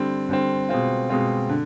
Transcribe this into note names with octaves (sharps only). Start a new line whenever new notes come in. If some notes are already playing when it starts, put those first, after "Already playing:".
Already playing: D3 G3 C4
D3 G3 C4
B2 G#3 C4 F4
B2 G#3 C4 F4
D3